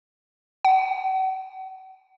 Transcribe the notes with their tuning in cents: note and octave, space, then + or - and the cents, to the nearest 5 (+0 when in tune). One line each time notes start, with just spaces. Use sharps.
F#5 +40